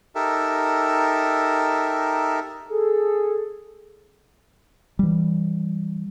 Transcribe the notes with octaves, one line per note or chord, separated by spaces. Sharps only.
D#4 G4 A4 A#4 E5
G#4 A4
E3 G3